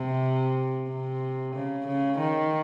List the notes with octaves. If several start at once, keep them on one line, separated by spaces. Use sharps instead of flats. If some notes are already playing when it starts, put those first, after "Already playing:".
Already playing: C3
C3
C#3
C#3
D#3